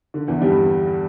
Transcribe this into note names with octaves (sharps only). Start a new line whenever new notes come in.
D3
E2 E3
G2 G3